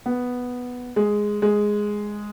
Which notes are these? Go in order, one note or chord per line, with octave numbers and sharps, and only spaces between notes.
B3
G#3
G#3